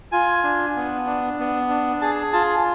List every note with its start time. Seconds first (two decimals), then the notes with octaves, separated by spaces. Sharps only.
0.12 F4 G#5
0.44 D4
0.76 B3
1.06 D4
1.39 B3
1.70 D4
2.01 G#4 A5
2.33 F4 A5